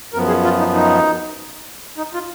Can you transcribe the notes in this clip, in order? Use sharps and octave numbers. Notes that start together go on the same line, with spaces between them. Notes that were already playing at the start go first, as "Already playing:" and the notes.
F#2 F3 B3 A#4
G#4
F4
D#4
D#4
D#4
F4